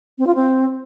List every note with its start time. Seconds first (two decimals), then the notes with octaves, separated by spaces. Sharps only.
0.18 C4
0.27 F4
0.35 C4